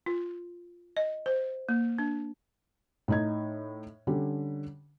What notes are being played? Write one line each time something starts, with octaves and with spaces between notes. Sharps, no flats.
F4
D#5
C5
A#3
D4
A2 D#4 G#6
D3 G3 C#4